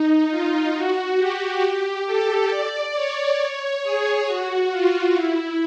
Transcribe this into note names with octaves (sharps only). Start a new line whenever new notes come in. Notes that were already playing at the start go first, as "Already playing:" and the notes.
Already playing: D#4
F4
F#4
G4
G4
A4
D5
C#5
C#5
G#4
F#4
F4
E4